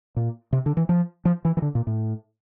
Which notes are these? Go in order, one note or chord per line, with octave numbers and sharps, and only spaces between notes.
A#2
C3
D3
E3
F3
F3
E3
E3
D3
A#2
A2